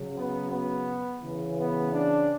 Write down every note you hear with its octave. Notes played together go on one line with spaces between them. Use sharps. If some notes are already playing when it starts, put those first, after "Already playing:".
Already playing: C#3 F#3
B3
B3
C#3 E3
B3
D4